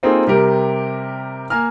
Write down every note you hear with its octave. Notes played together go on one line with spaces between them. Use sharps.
A#3 C4 D#4 F4 G#4 A4
C3 G3 G4 A#4
A#3 G#5 A#5 F6